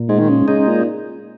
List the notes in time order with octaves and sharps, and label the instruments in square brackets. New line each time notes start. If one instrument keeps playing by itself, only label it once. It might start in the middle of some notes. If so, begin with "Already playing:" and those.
Already playing: [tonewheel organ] A#2
[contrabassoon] G#2 [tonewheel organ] G#3
[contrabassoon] D#3
C#3
[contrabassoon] C#3 [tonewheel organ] D#4
[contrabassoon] A#2